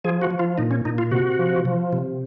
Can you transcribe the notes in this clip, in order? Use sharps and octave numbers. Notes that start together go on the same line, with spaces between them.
F3 G#4
F#4
F3
F4
A#2 D#4
C#4
A#2 D#4
F4
C3 F#4
F3
F3
C3